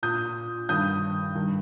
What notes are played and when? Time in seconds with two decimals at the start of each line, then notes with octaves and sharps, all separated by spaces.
0.03 A#2 D#6 G6
0.69 G2 D#3 D#6 G6
1.35 G2 D#3